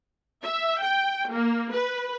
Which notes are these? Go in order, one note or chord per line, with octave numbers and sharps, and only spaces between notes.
E5
G5
A#3
B4